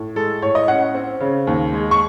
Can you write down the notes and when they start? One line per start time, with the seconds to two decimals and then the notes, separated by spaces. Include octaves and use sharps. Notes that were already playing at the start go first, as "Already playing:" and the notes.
Already playing: A2
0.16 G#3 A4
0.42 A2 C#5
0.55 D#5
0.68 C#4 F#5
0.95 C4
1.20 C#3
1.47 D#2
1.73 G#3
1.91 C#6